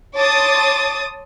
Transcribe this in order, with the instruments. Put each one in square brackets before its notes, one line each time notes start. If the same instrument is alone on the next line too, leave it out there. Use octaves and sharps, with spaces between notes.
[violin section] C#5 A5 C6 D6 D#6 A6